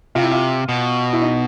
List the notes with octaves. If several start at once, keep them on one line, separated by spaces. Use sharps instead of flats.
C3 F4
E4
F4
B2
E4
D#4